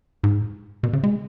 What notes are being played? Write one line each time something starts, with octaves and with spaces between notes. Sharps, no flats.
G#2
B2
C#3
G#3